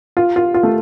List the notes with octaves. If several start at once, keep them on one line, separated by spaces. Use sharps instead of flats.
F4
F4
F4
A3